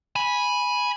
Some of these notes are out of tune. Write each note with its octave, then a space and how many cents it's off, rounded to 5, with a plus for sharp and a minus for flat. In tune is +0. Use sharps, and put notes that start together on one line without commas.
G#5 +0 B5 -10